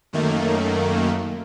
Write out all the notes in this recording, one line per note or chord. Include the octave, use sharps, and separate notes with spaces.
F#2 D#3 A3 A#3